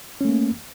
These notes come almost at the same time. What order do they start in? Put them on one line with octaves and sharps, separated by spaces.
C#4 A3 A#3